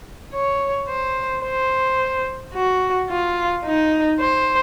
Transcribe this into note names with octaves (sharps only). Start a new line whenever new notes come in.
C#5
C5
C5
F#4
F4
D#4
C5